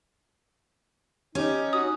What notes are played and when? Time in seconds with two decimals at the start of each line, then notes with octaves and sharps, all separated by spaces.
1.35 C#4 D#4 G4
1.73 F#4 D#6